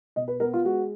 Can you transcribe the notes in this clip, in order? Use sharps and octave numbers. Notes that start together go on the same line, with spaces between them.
B2 D#5
B4
B3 A#4
F4
G#3 F#4